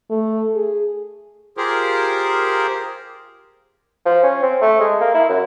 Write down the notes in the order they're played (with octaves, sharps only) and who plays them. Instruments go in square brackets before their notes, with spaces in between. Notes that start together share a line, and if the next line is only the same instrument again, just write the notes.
[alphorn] A3
G#4
[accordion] F4 G4 G#4 A#4 C5
[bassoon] F3
C#4
C4
A3
G#3
A#3
E4
F#2